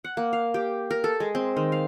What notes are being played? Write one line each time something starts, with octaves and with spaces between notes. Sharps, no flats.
F#5
A#3
F5
G4
A#4
A4
G#3
C4
D#3
F5